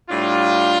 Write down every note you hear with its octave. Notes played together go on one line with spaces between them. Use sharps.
A2 G3 D4 F4